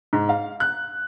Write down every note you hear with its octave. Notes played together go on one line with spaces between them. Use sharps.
G#2
F5
F#6